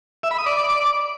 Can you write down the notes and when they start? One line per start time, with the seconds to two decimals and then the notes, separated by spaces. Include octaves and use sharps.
0.23 E5
0.31 B5
0.38 D#6
0.46 D5